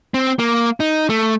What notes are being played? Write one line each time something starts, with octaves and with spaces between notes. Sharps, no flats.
C4
A#3
D#4
A3